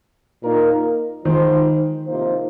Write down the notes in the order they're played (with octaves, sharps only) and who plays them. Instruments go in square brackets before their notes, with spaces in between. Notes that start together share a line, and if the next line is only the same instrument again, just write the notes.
[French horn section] A#2 A#3 D#4 A#4
[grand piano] D#3 [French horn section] F3 G#3 D#4 C5
[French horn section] C3 F3 A#3 D#4 C5